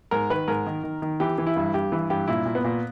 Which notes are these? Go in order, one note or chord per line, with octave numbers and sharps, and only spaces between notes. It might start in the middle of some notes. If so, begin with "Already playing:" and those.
G#2 A#4
D#3 B4
G#2 A#4
D#3
D#3
D#3
E3 G4
E3
E4
G2
G2 G4
E3
G2 G4
A#2 E4
A#2
B3
A#2